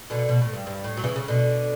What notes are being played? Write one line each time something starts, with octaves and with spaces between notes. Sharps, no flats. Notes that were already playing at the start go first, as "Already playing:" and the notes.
B2 D3
B2
A2
G2
G2
A2
F#3
C#3 E3
C#3
B2 D3